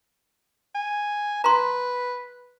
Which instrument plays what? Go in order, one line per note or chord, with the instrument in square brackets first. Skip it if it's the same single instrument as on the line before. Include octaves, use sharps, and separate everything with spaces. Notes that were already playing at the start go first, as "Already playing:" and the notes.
[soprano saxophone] G#5
[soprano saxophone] B4 [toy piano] A#5 C6